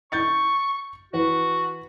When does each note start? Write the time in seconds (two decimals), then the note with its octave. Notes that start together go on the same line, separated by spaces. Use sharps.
0.12 C#6 G6 A6 C#7
1.13 E3 F#4 B4